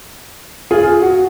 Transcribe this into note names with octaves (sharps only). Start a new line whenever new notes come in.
F4 G#4
F#4